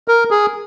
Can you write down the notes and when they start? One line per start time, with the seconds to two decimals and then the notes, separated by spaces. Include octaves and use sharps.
0.08 A#4
0.31 G#4